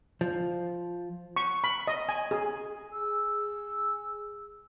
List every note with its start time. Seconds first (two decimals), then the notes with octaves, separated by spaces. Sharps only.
0.21 F3
1.36 C#6
1.64 B5
1.87 D#5
2.09 G#5
2.31 G#4
2.93 G#4 E6